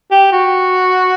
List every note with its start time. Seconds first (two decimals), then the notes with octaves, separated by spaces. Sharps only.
0.11 G4
0.32 F#4